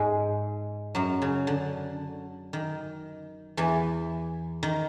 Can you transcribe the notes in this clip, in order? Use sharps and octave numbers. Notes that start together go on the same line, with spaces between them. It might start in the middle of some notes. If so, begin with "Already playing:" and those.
Already playing: G#2 G#3
F#2 F#3
C#3
D3
D#3
E2 E3
D#3